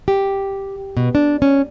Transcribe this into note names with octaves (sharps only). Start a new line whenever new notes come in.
G4
B2
D4
C#4